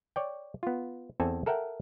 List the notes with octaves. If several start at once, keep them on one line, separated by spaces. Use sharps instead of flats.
C#5 D5 G5
B3 F4
E2 C4 A4 G#5 A5
A4 A#4 E5 F#5 G5